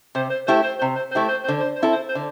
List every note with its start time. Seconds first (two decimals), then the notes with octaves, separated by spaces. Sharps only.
0.15 C3 C5
0.30 C5
0.47 A3 E4 G4 C5
0.63 C5
0.79 C3 C5
0.95 C5
1.11 C5
1.15 A3 E4 G4
1.28 C5
1.44 C5
1.48 D3
1.60 C5
1.76 C5
1.82 C4 E4 A4
1.92 C5
2.09 C5
2.15 D3